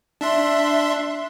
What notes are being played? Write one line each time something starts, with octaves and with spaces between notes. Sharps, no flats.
D4 E5 C6